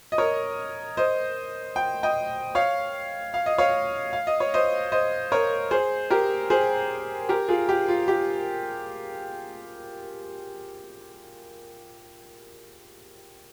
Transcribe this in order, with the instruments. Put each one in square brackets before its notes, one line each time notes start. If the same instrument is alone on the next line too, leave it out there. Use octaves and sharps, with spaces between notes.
[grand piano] D#5
A#4 C#5
C5 D#5
G5
D#5 G5
C#5 F5
F5
D#5
C#5 F5
F5
D#5
C#5
C5 D#5
C5 D#5
A#4 C#5
G#4 C5
G4 A#4
G#4 C5
G4 A#4
F4 G#4
G4
F4
G4